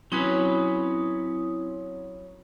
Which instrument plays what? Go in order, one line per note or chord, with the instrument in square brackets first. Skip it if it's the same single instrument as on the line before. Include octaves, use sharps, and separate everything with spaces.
[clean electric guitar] F#3 C#4 B4 [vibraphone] C4 E4 D#6